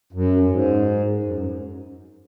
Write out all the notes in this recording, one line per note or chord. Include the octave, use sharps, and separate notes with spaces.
F#2
F#2
G#2
F#2
F#2